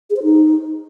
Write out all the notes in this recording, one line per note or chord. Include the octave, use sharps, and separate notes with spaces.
G#4
C5
D#4